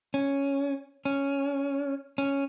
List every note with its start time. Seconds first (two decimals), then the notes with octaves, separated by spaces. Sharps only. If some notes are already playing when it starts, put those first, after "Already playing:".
0.14 C#4
1.05 C#4
2.18 C#4